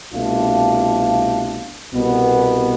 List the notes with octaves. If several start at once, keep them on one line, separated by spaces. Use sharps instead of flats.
C2 B2 A3 D4 F4
C2 B2 B3